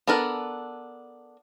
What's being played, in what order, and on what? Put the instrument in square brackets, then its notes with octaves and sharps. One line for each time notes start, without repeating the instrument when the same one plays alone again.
[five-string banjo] B3 D4 A4 A#4